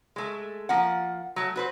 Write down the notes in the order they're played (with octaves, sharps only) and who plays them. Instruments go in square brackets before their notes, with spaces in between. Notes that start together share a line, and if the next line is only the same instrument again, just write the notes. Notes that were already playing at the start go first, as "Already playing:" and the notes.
[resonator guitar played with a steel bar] G#3 A3
F3 A#3 F#5
F#3 A3
F#4 B4 C5